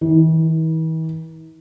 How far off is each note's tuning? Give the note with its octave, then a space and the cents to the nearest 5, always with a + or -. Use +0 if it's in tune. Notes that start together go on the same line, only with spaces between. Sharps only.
E3 -45